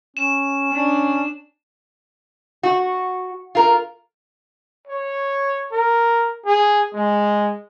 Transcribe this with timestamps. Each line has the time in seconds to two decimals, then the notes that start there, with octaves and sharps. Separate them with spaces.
0.17 C#4 E7
0.72 C#4 D4
2.63 F#4
3.55 F4 A#4
4.88 C#5
5.72 A#4
6.46 G#4
6.93 G#3